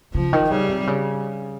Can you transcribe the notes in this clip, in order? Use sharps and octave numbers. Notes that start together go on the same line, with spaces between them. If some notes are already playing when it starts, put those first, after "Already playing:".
C#3 F3
D#3
C#3 G3
C3
C#3